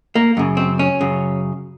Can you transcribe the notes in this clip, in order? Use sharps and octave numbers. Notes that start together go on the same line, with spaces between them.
A#3
F#2 C#3
C4
C#4
F#2 C#3